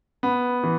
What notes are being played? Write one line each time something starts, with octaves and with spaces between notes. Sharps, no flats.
B3
E3